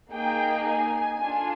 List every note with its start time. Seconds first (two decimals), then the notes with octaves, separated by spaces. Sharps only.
0.13 A#3 D#4 G#4 G5
0.67 G#5
1.22 D4 F4 A4